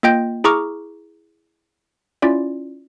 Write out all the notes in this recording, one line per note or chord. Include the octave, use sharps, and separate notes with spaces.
A#3 F4 D#5 G5 G6
E4 G#4 A#5 C#6 D6 F6
C#4 E4 F4 D5